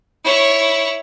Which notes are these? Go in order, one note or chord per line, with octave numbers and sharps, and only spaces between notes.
E4 C#5